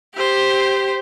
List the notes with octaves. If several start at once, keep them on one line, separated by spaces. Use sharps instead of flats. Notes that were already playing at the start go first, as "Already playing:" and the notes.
G4 C5